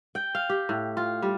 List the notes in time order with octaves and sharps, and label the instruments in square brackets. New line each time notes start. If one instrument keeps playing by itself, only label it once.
[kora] G5
F5
G4
A2
F4
G3